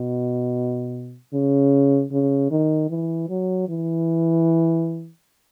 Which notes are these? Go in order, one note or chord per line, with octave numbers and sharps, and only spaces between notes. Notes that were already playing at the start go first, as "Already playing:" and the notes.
Already playing: B2
C#3
C#3
D#3
E3
F#3
E3